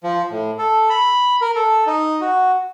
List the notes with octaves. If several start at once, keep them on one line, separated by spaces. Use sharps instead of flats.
F3
A2
A4
B5
A#4
A4
D#4
F#4